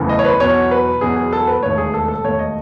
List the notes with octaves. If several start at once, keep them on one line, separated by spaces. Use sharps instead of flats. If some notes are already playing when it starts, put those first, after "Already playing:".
Already playing: F#1 E2 C#3 E3 A3
D#5
C#5
B4
E2 B2 F#3 C#5
B4
E2 B2 F#3 G#4
G#4
A4
B4
E1 D#2 D#3 A3 C#5
G#4
A4
A4
E1 D#2 D#3 A3 C#5
D#5